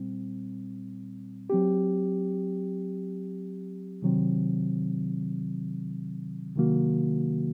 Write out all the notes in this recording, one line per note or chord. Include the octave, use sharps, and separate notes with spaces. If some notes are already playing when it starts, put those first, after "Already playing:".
Already playing: A#2 G3 C4
F#3 C4 G4
C3 D#3 F#3 C4
C3 D#3 F#3 A#3 F#4